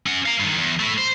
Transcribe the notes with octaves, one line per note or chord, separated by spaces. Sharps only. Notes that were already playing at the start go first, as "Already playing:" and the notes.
C#4 F#5
F5 A#5
G2 D#3
E2
A3 E4
C5